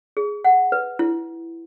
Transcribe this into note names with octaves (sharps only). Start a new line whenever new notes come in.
G#4
F#5
B4
E4